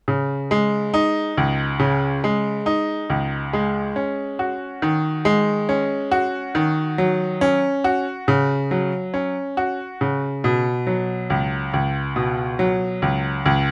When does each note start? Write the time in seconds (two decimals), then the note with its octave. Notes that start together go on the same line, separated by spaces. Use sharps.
0.08 C#3
0.51 G#3
0.94 D#4
1.37 C#2
1.79 C#3
2.24 G#3
2.66 D#4
3.10 C#2
3.53 G#3
3.96 C#4
4.39 F#4
4.82 D#3
5.25 G#3
5.69 C#4
6.11 F#4
6.55 D#3
6.98 F#3
7.41 C#4
7.84 F#4
8.28 C#3
8.71 F#3
9.14 C#4
9.57 F#4
10.01 C#3
10.44 B2
10.87 F#3
11.30 C#2
11.73 C#2
12.16 B2
12.59 F#3
13.02 C#2
13.46 C#2